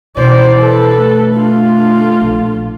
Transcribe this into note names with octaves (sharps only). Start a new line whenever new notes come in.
B2 E3 C5 D5
A4 B4
A3
D4 F4
A#1